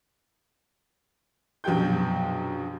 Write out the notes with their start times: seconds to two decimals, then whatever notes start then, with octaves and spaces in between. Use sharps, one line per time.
1.64 A#1 F#2 B2 G4 G5 G6